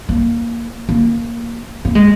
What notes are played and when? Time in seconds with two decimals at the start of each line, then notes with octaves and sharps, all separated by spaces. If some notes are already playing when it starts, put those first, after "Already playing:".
0.09 A#3
0.89 A#3
1.85 A#3
1.95 G#3